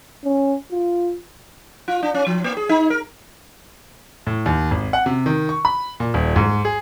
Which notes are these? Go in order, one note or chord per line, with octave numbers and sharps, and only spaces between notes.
C#4
F4
F4
D4
C#4
F3
A#3
G#4
D#4
A#4
A2
D#2
G#1
F#5
C3
D#3
C#6
B5
A#2
D#1
G#2
G#4